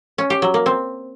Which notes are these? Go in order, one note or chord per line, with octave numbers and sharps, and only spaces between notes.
C#4
G4
F#3
A#3
C4